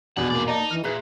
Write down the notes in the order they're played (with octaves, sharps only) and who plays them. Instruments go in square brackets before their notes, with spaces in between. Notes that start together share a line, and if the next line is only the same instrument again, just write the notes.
[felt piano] A#1 E2 B2 [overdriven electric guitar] E3 F#5
[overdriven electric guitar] G#2 D5 [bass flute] A#3
[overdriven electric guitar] D#4 [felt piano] D5 A5 D6
[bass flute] E3 [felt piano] F6
[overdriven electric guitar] A#2 [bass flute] G#4 [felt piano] B4 E5 F#6